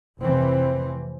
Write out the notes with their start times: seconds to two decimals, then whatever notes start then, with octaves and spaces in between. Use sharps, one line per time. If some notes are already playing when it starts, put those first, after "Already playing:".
0.21 F1 C3 E3 C4